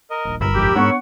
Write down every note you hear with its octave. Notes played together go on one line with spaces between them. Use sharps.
A#4 D#5
D#1 A#1
G1 A#4 B5 E6
A#1 F2 G#2 G4
G#2 B3 D4 C#5 F#5 C#6